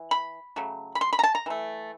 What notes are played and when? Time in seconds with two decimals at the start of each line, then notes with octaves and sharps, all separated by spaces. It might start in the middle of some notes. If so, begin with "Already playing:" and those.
Already playing: E3
0.11 B5
0.56 C#3 F#3 A3
0.95 B5
1.01 C6
1.13 B5
1.19 A#5
1.24 A5
1.35 A#5
1.46 E3 A3